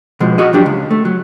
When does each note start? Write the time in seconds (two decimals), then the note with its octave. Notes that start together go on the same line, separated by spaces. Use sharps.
0.20 B2 F3 G#3
0.38 F#4 G#4 D#5
0.53 F3 F#3 D4 G4
0.66 C#2
0.91 A3
1.05 F#3